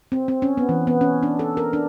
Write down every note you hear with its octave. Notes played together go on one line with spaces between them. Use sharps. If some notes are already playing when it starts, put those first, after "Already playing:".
C4
C4
C#4
B3
E3
B3
C#4
D4
A4
A#4
D4